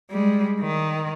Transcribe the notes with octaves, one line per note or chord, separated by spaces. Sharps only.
G3 G#3
D#3